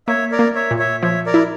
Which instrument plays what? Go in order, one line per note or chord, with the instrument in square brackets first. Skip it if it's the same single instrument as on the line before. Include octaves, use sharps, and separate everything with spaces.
[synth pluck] A#3 [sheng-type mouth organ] C#5 E5
[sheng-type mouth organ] A#4 D5
[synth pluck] A#3
[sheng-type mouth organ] C#5 E5
[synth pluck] A#2
[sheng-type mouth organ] C#5 E5
[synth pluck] F3 [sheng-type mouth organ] C#5 E5
[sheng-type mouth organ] A#4 D5
[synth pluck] E4